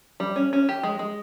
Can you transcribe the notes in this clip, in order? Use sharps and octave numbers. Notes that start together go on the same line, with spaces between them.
G3
C#4
C#4
G4
G#3
G#3